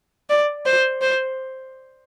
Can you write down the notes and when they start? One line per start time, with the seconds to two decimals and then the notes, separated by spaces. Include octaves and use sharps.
0.29 D5
0.66 C5
1.02 C5